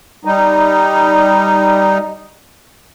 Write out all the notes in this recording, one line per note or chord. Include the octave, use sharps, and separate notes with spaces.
G3 D#4